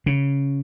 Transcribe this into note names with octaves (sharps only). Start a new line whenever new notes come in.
C#3